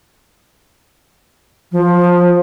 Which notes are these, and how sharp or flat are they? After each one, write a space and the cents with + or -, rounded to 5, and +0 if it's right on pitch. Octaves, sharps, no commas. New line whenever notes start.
F3 +15